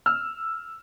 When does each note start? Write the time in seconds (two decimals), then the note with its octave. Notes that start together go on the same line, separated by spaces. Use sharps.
0.06 E6 F6